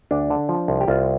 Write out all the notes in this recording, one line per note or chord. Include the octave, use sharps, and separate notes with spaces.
D2 D4
D3
F3
C2
G4
C2 F4